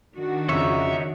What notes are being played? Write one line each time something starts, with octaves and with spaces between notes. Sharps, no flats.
D#3 D4 F#4
F2 C#3 D#4 C#5 E5